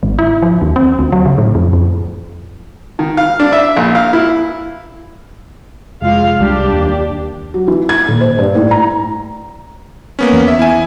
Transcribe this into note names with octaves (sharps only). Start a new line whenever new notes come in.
G#1
E4
F3
D#2
C4
D2
F#3
C#3
A2
F2
F2
D#3
F5
D4
E5
A#1
F5
E4
F1 G#3 F4 F5
C2 G3 D4 G4
D#2
F#3
E3
G#6
D#1
C5
G2
A2
A#5
A#3 B3 C#4
E2
E5
E4 G#5